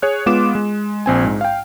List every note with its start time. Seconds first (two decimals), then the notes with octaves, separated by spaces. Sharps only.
0.02 G#4 C#5 F#6
0.26 G#3 B3 F4 D6 E7
0.55 G#3
1.06 A#1 C4 G#5
1.24 G#2
1.41 F5 G5